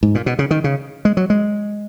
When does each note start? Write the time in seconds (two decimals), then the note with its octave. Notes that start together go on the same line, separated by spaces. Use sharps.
0.03 G#2
0.15 A#2
0.26 B2
0.39 C#3
0.51 D#3
0.64 C#3
1.05 G#3
1.17 F#3
1.30 G#3